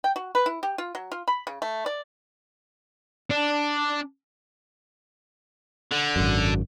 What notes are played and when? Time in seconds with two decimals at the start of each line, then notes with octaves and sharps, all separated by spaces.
0.04 G5
0.16 F#4
0.35 B4
0.46 E4
0.63 G4
0.78 F4
0.95 F#3
1.12 F4
1.28 B5
1.47 C#3
1.62 A3
1.86 D5
3.30 D4
5.91 D3
6.16 G#1 F#2